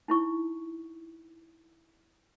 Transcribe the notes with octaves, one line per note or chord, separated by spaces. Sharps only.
D#4 E4 C#6